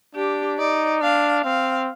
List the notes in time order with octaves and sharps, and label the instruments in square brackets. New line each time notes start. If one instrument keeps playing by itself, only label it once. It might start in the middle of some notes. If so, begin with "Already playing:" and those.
[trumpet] D4 [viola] G4
[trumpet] D#4 [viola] D5
[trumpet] D4 [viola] F5
[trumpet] C4 [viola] F5